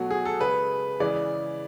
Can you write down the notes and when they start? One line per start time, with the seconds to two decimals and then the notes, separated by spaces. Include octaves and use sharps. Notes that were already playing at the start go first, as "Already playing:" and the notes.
Already playing: B2 F#3 A3 F#4
0.10 G#4
0.25 A4
0.41 C#3 G#3 B4
1.00 C#3 E3 G#3 D5